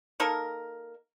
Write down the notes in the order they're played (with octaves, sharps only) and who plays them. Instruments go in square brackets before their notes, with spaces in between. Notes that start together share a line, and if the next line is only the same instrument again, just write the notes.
[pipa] A#3 D#4 A4 A#4